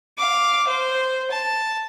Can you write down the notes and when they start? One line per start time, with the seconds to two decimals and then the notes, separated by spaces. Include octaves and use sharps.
0.18 F5 D6
0.67 C5
1.31 A5